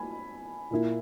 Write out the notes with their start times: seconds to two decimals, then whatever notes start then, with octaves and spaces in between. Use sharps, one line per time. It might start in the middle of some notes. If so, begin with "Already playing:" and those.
Already playing: G#5 B5
0.71 A#2 A#3 E4